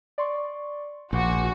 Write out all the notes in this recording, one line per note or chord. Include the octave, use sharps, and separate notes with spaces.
D5 C6 C#6
A#1 F#4 G#5 C6 D6